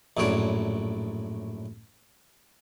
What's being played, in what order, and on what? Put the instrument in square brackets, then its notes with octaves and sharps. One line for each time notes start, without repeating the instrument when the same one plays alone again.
[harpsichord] A#1 F#2 A2 C#5 D5